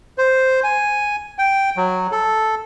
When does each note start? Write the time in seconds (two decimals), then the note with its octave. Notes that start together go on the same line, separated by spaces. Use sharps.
0.18 C5
0.63 G#5
1.39 G5
1.77 F#3
2.12 A4